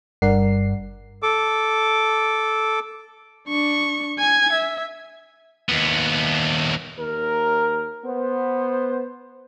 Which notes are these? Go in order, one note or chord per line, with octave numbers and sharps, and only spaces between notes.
G1 G2 A#4 D5 F#5 C7
A4 D6
D4 C#6
G#5 G#6
E5
D#2 B3
D#2 A#4
B3 C5